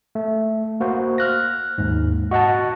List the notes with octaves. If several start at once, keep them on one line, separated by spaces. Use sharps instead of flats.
A3
A#3 F#4 C5
F6 F#6 A#6
D#2 G#2
F#4 D#5 F#5 A5